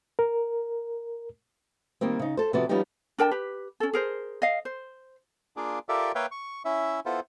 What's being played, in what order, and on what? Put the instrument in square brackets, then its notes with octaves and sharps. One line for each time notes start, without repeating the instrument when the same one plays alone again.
[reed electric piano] A#4
[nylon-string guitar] D#3 G3 A#3 C4
C#3 D#4
A4 C5
C3 F3 B3 F#4 D5
F3 G3 B3 C#4 D#4 G4
[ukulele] D4 A#4 G5 A5
G4 B4
C#4 A4
G#4 A#4 C5
D#5 F5
C5
[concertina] A#3 D4 F4 G#4 D5
F4 G4 A4 A#4 D5 E5
A#3 B4 C#5 E5 F5 G5
C#6
C#4 E4 E5
B3 E4 F4 A4 C5